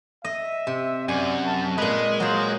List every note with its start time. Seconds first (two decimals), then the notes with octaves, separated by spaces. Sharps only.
0.24 D#5 E5
0.67 C3
1.08 F#2 D5 G#5
1.46 A5
1.78 A#2 G#3 B4 D#5
2.20 F#3 F4 C5